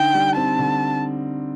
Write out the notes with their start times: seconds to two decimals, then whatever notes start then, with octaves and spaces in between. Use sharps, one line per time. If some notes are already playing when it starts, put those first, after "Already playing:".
Already playing: D3 D#4 G5
0.15 G3
0.36 C4 A5
0.59 D3